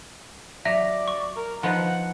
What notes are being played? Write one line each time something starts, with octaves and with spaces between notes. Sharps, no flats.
F#3 D5 E5 A#6
C#6
A#4
F3 B3 D#4 F#5